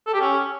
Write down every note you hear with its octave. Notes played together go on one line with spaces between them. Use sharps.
A4
G4
C#4